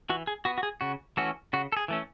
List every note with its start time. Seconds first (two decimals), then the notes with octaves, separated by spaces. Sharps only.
0.10 E3 F#4
0.27 G#4
0.45 B3 F#4
0.58 F#4
0.63 G#4
0.81 C#3 F#4
1.17 E3 A3 C#4 F#4
1.53 C#3 F#4
1.72 A4
1.77 G#4
1.88 E3 A3 C#4